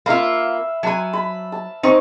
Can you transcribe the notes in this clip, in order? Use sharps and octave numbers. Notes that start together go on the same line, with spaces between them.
A#3 F4 E5 F5 B5
F#3 G#5 A5 B5
B5
A5
C4 D#4 C#5